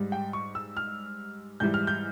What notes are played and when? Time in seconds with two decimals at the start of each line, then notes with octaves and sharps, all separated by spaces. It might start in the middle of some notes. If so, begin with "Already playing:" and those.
Already playing: G#2 G3
0.12 G5
0.33 C#6
0.55 E6
0.77 F6
1.60 G#2 E3 G3 G6
1.74 F6
1.87 G6